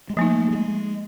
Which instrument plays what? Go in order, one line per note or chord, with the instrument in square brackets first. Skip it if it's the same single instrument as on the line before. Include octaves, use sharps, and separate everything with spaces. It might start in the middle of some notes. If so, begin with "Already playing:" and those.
[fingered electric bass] G#3
[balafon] F3 A#3 D#4 [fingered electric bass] A3
[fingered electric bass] G3
G#3